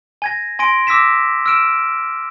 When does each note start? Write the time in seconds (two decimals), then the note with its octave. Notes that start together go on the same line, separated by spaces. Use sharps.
0.22 G#5 G#6 A#6
0.59 G#5 C6 A#6 D7
0.87 D6 E6 A#6 B6 E7
1.46 E6 F6 D7 E7